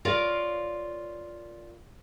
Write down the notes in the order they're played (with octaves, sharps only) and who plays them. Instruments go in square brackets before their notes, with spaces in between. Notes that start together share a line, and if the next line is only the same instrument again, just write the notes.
[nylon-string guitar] F4 A#4 C#5 D5 F5